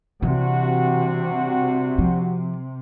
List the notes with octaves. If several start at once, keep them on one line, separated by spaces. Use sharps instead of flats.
C3 E3 G3 D4 F#4
F3